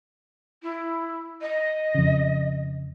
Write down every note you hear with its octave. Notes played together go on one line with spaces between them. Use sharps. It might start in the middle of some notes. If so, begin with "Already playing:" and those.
E4
D#5
F2 C#3